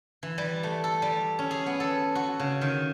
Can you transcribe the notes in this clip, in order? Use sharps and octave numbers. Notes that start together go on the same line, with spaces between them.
E3
G3
A3
A4
G3
C#4
G#4
B3
A4
F#4
C#3
D#3